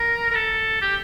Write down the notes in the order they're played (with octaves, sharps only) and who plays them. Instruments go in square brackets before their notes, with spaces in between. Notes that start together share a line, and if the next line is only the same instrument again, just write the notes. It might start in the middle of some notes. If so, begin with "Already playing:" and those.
Already playing: [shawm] A#4
A#4
A4
G4